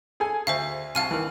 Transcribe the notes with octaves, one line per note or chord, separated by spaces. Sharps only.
G#4 A4 G#5
D2 C5 E5 F5
C2 F5 A5 F6 D#7
D#3 E3